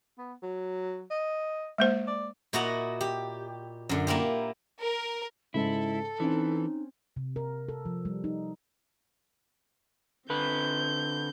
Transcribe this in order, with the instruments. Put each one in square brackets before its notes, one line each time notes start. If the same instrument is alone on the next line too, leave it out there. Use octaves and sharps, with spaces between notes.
[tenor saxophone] B3
F#3
D#5
[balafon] G#3 A#3 C5
[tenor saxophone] D5
[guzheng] A#2 E4 F#4 D#5 F#5 A#5
G4
F#2 D3
A#3 E4 F4 G4
[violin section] A#4
[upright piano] G#2 C#3 [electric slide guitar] E4 [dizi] A4
[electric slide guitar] E3 [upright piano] C4 C#4 [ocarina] D#4
[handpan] C3
A#4
A4
F3
G3
D#4
[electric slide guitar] D3 B4 [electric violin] C4 G6